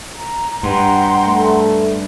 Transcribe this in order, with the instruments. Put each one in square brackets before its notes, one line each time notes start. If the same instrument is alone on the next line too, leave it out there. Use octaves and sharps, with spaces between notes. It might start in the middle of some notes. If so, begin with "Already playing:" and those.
[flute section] A#5
[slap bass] G2 [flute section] F#5 G5 A#5 [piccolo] C6
[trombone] A3